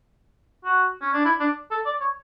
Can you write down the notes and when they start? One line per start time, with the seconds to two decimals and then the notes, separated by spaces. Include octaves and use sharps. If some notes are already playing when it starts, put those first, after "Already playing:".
0.65 F#4
1.01 C#4
1.13 D4
1.25 E4
1.40 D4
1.71 A4
1.86 D5
2.00 C#5